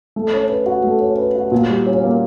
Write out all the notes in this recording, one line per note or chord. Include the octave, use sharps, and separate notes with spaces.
A3
C#4
B4
F#4
A3
C#4
B4
F#4
A#2
G3
C#4
A#3